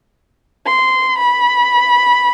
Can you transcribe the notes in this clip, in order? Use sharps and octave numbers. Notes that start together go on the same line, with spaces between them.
C6
B5